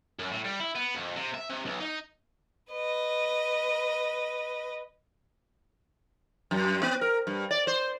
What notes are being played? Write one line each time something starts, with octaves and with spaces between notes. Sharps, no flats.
F#2
A2
G3
E4
B3
F2
C3
E5
C3
B1
D#4
B4 D#5
F#2
B3
A#4
G2
D5
C5